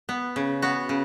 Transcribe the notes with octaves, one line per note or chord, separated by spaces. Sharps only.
B3
C#3
B3 F#4
C#3